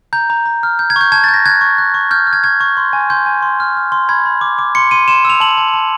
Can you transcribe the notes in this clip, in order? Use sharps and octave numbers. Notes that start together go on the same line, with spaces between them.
A#5 G6
A#5
A#5
F6
G6
G#6
C#6 G6
A5 G#6
A6
G6
A#6
F#6 G#6
C#6
F#6
C#6
F6 G6
F6
G#6
C#6 G#6
C#6
C6
G#5
C6 G6
G#5
C6
F6
F6
C6
B5 G#6
B5
D6
D6
C6 C#7
C6 D#7
C6 E7
E6 F7
A5 F#7
A5
A5